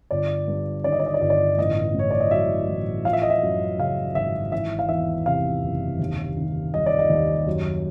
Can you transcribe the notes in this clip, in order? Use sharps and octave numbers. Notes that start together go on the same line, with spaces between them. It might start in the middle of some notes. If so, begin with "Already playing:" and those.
G1 D5
G2
D#3 D5
D#5
D5
D#5
D5
G1 D#5
D5
A1 D#5
A2 C#5
D5
D#5
F#3 E5
A1
F3 F5
E5
D#5
E5
F#2
C#3 F5
G#1 E5
E3 E5
F5
E2 E5
C3 F5
F#1
D#2
D#3
G3 D#5
D5
D#5
D#2
F#2